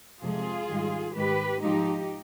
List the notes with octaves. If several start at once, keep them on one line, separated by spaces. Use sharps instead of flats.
F2 C3 F3 G#3 F4 G#4
G#2 D#3 G3
G#2 D#3 G#3 G4 B4
G#2 F3 G#3 D#4 G4